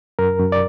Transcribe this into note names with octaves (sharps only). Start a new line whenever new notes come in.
F#2 A#4
F#2
D5